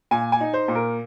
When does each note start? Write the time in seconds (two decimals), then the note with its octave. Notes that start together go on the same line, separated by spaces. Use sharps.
0.11 A#2 G#5
0.32 G#5
0.41 D#4
0.53 C5
0.68 A#2
0.75 A#4